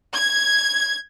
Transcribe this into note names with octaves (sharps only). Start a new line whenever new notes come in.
G#6